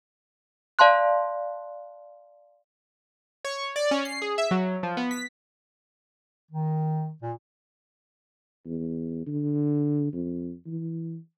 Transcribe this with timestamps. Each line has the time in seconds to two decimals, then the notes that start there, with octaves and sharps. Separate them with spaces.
0.79 D5 F5 A5 C6 F#6
3.45 C#5
3.76 D5
3.91 C#4
4.05 C7
4.22 G#4
4.38 E5
4.51 F#3
4.83 F3
4.97 B3
5.11 B6
6.51 D#3
7.22 A#2
8.66 E2
9.27 D3
10.13 F2
10.66 E3